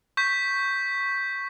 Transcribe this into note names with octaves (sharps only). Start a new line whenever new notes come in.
C#6 G6 B6